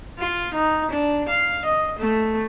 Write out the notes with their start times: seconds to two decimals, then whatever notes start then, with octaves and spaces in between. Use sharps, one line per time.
0.18 F4
0.54 D#4
0.91 D4
1.29 F5
1.65 D#5
1.99 A3